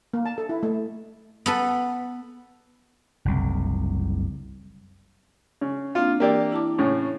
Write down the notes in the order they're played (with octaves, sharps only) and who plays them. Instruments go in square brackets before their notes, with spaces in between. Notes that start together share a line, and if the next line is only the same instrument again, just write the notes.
[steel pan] A#3
A5
A4
E4
A3
[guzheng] B3 A4 B4
[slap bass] F#1 C2
[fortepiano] C#3
[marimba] A#3 C4 D4 [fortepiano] F4
[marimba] E3 E6 [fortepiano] A#3 G4 D5
[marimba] E4 A5 D6
[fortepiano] A2 C#3